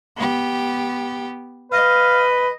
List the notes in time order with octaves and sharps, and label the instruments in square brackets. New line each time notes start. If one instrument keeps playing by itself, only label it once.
[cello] B3 G4
[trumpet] B4 [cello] D#5 [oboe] F5